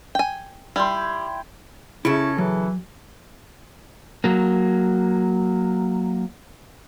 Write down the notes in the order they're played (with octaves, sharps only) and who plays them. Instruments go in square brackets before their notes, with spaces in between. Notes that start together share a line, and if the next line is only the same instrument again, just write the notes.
[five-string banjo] G5 G#5
[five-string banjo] G3 [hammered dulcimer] E4 G5 C6
[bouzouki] C#3 A4 [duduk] C#4 [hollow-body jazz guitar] E4 E5
[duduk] E3 [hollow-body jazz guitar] F#3
[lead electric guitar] F#3 A#3